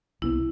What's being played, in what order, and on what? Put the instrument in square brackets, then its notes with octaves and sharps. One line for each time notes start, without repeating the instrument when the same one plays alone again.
[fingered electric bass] C2 C3 E3 B3 [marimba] E4